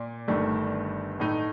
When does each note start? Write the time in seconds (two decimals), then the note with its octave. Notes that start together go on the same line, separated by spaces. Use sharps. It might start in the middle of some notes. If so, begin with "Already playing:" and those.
Already playing: A#2 D5
0.28 G1 G2 D#3 A3 D4
1.20 A2 A3 D#4 D#5